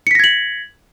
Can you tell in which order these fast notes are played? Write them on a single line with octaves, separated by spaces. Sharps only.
C#7 B6 A#6 G#6 F#7